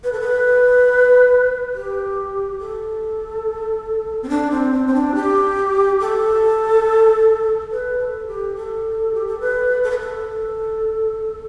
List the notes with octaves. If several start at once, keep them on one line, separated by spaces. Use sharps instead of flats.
B4
A4
B4
G4
A4
C4
D4
C4
C4
C4
D4
G4
A4
B4
A4
G4
A4
G4
A4
B4
A4
B4
A4